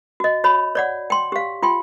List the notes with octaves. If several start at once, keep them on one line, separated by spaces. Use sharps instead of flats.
F#4 D#5
F#4 C#5 B5
C#5 D5 F#5
G5 C6
G4 F5
F4 G5 C6